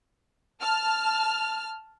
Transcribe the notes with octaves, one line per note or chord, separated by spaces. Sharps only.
A5 F6